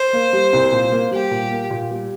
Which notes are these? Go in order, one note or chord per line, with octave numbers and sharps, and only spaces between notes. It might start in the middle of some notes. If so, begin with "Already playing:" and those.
Already playing: C5
A#3
G3
C2
A#2
A#3
G3 G4
A#2
A#3
A#2
G3